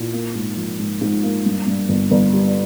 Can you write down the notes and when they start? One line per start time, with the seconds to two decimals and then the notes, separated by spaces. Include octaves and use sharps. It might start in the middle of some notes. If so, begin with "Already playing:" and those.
Already playing: A#2 E4
0.13 A#3
0.35 G#2
0.56 F3
0.79 G#2
1.01 G#2
1.23 A#3
1.45 G2
1.67 G2
1.89 G1
2.11 G1
2.33 G3